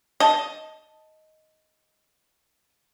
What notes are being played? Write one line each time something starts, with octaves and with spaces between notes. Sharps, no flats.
D#5 A5